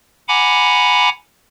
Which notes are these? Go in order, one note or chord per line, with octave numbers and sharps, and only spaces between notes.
F#5 G#5 A#5 B5 D6